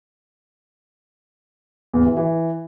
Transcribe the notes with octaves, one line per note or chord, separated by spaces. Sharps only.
E2
E3
E3